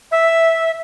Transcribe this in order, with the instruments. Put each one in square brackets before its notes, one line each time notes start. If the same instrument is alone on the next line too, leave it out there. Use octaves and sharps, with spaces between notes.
[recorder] E5